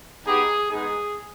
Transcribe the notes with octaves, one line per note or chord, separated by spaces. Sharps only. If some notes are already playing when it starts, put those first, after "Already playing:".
B3 D#4 G4 G#4
G#3 B3 D#4 G#4